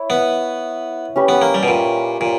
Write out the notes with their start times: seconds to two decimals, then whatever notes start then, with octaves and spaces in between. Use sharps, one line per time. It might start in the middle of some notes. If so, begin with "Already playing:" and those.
Already playing: E4 C#5
0.10 B3
1.16 C#4 G4 B4
1.29 B3
1.42 A#3
1.54 G3
1.63 B2
1.68 A#2
2.21 A#2